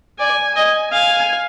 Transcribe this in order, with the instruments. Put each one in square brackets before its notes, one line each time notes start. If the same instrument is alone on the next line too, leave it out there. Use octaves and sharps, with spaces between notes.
[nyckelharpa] D5 [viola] G#5
[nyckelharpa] D#5 [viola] G#5
[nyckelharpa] F5 [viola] G#5